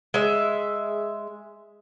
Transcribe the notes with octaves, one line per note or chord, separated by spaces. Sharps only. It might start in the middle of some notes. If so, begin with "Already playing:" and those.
G#3 E5